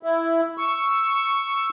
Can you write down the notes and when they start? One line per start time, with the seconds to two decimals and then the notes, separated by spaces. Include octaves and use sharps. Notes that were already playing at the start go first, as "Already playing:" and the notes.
0.03 E4
0.58 C#6 E6